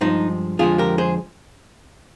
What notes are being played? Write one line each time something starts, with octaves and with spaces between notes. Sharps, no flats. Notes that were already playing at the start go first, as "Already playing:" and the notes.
G2 F3 G#3 C4 D#4
F2 D3 F3 G#3 F4 G#4
G4 A#4
G#4 C5